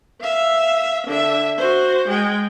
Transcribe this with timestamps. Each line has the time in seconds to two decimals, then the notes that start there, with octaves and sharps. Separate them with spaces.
0.20 E5 F5
1.07 D3 E5
1.57 F#4 C5
2.08 G#3 G5